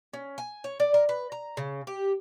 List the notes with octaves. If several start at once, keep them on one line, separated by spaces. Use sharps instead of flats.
C#4
G#5
C#5
D5
A#4
B4
A#5
C#3
G4